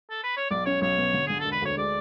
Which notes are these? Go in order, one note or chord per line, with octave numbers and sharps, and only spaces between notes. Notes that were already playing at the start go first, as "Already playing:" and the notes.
A4
B4
C#5
B1 D5
C#4 C#5
B1 C#5
B2
D3
D3 G#4
A4
E1
B4
D2 C#5
G#3 D5